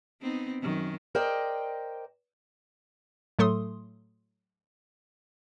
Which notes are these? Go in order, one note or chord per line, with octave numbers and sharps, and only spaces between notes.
B3 C4 D#4
F#2 D#3 F#3
A#4 C5 D5 D#5 G5
A2 F#3 A3 A4 C6 D#6